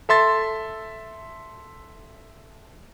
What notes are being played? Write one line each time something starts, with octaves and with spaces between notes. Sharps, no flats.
A4 E5 C6 A6